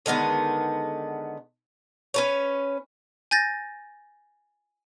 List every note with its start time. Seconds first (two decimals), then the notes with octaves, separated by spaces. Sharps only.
0.06 D3 D#3 G#3 B3
2.14 C#4 B4 C#5
3.31 G#5 G6 A6 A#6